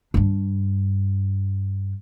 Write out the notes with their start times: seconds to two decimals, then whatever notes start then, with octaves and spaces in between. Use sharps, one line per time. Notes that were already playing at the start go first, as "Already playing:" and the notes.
0.14 G2 D4